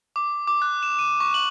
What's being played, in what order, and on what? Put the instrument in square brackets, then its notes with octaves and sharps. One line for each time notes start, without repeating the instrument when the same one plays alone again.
[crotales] D6
D6
F#6
E7
D#7
C#6
F#7